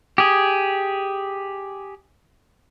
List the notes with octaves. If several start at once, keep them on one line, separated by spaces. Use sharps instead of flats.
G4 G#4